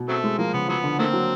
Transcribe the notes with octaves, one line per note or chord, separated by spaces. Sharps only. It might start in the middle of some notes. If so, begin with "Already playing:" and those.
Already playing: B2
C#3 F#3 A3 C4
G#3
F3 A#3
C#3 B3
F3 F#3 B3
D3
D#3 A3 A#3 C4
F#3